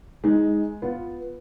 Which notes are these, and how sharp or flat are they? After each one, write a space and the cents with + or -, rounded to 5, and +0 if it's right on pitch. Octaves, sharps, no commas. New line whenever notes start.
G#3 +0 D#4 +20
B3 +0 F4 +0